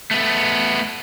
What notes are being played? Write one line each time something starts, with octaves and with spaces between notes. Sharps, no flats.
A3 B3